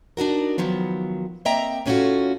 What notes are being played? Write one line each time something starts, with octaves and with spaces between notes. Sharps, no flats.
D4 D#4 F#4 A#4
D#3 F3 F#3 B3
A#3 C4 D#5 E5 G5 A#5
A2 A3 C#4 D#4 F4 F#4